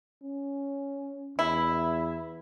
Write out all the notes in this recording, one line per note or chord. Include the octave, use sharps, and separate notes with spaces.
C#4
E2 E4